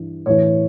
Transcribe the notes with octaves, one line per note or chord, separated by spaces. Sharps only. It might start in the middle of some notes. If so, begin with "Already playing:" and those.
Already playing: G2 E3
A2 E3 C#5